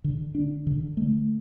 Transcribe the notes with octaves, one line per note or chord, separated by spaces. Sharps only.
D3
D4
D3
A3